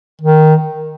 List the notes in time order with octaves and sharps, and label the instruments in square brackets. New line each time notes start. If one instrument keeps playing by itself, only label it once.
[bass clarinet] D#3